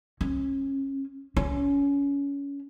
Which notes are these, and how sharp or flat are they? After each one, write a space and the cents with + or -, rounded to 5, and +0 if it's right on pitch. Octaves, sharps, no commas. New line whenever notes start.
C#4 -30
C#4 +25